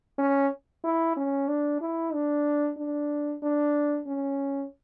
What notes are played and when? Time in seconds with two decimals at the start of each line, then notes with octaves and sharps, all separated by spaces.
0.18 C#4
0.84 E4
1.17 C#4
1.48 D4
1.81 E4
2.13 D4
2.77 D4
3.43 D4
4.07 C#4